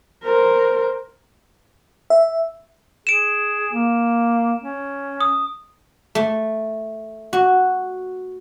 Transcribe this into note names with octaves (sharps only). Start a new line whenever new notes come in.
A#4 C5
E5
G#4 D7 E7
A#3
C#4
D#6
A3
F#4